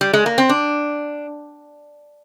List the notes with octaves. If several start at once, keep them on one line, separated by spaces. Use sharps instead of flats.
G3
G#3
A#3
C4
D4